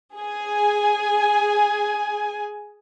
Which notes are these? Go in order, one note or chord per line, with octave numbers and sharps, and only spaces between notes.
G#4 G#5